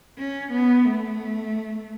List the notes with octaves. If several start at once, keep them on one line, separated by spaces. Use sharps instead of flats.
C#4
B3
A3